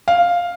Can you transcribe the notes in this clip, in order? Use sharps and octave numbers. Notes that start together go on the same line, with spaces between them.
F5